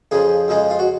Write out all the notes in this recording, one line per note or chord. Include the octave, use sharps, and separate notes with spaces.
F2 C#3 F3 G#4
F2 C#3 F3 G#3
F4
F#4